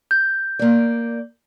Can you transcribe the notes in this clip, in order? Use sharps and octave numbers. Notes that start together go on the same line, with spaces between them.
G6
A#3 D5